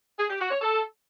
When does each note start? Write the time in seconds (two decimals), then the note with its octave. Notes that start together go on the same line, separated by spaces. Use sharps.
0.19 G#4
0.29 G4
0.40 F#4
0.51 C#5
0.61 A4